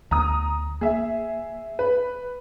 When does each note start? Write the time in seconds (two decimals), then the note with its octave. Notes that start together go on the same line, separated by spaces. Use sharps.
0.11 D2 A#5 D#6
0.81 A#3 G#4 E5
1.79 B4